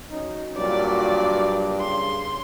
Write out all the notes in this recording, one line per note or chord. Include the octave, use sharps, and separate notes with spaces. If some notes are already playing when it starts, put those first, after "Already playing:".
F#3 C#4 D#4
G2 A#2 F#3 D5
C#3 C6